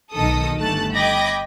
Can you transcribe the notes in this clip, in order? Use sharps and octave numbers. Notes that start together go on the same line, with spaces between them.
B1 D#3 A4 D#6
G1 A3 A5 F#6 A6
D#5 G5 B5 D6 G#6 A#6